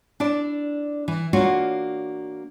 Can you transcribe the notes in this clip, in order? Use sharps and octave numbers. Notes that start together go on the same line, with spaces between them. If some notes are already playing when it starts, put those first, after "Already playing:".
D4 E4 D5
E3
A#3 D4 F4 F#4 C#5